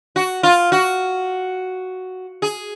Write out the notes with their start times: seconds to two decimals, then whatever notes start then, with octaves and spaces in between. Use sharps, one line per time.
0.16 F#4
0.43 F4
0.72 F#4
2.42 G#4